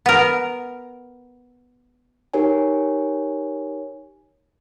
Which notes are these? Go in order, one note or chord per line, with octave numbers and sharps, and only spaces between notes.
B3 A#4
D#4 G4 A#4 C#5 G#5